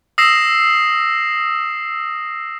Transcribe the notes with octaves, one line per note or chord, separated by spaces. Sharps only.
D#6 E6 A#6 C7 E7